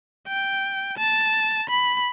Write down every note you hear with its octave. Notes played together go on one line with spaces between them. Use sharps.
G5
A5
B5